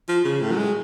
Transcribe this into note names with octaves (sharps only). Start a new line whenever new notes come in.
F3
C#3
A2
F#3
G#3